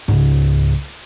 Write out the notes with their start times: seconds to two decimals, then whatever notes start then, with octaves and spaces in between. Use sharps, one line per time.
0.08 C#2 G#2